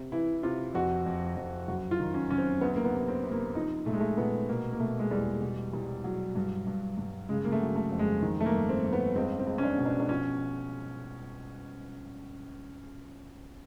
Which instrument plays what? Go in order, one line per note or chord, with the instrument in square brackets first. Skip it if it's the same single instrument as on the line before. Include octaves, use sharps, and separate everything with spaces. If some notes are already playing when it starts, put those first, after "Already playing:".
Already playing: [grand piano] C3
E3 E4
C3 F4
F2 F#4
F2
F2
F#2 F#4
F4
D#3
C#4
F#2 C#4
C4
D2 B3
A#3
B3
C3
C4
C3
A#3
F3 D#4
A#2 A3
G#3
A3
A#2 B3
B2 A#3
A#3
B2 A3
G#3
E2 G3
B2
C2
F#3
G2
G2
G2
C#3 G#3
A#3
A3
F#3
A3
F2
G#3
D#3
A3
A#3
G2
C4
G2
B3
C#2 C4
C4
C#2
C#4
D4
B2
D4
D4
F3 C#4